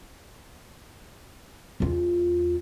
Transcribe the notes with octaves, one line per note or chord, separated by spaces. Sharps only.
E2 F4